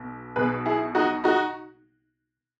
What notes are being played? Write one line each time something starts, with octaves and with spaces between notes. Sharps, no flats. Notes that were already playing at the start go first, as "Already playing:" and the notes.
Already playing: B1 B2
B1 B2 G#4 B4
E4 G#4
D#4 F#4
D#4 F#4